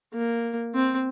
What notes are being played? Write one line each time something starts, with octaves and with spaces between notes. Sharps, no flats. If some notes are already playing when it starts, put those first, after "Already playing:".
A#3
C4